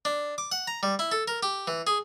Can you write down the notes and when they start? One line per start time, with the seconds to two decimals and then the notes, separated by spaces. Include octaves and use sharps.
0.05 D4
0.38 D6
0.52 F#5
0.67 A#5
0.83 G3
0.99 E4
1.12 A4
1.28 A#4
1.43 G4
1.68 E3
1.87 G#4